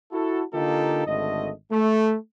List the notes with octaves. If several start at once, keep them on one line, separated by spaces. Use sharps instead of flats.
E4 F#4 A4
D3 A#3 D#4 F4 G4 A4
G#1 D3 A3 D#5
A3